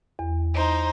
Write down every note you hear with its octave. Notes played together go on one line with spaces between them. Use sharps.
E2
D#4 C5